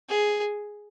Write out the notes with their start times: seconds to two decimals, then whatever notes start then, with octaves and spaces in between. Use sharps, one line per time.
0.09 G#4